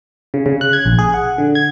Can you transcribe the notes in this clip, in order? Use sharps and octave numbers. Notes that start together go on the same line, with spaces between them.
C#3
C#3
F#6
G#6
A#1
G#4
F#5
D3
G#6